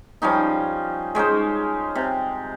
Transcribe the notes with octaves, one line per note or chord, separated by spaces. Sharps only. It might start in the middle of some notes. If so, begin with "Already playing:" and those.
F3 G3 C#4 D#4
G#3 C#4 D#4 C5
C3